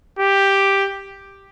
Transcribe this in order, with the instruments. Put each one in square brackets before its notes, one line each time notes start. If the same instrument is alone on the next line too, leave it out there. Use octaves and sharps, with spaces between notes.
[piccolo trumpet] G4